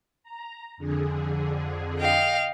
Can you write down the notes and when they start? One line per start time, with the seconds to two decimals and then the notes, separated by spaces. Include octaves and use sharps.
0.23 A#5
0.77 F2 D3 G#4
1.99 D#5 F5 G5